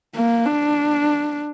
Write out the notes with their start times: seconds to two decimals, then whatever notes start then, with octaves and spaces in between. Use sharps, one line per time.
0.16 A#3
0.46 D4